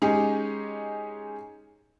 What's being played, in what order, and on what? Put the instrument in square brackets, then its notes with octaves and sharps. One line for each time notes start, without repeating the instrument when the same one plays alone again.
[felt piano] G#3 C#4 D#4 G4 G#4